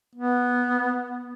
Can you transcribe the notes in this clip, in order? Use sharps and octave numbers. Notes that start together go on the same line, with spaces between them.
B3